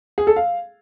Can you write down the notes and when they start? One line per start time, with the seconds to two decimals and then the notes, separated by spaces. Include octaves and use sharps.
0.18 G#4
0.27 A4
0.36 F5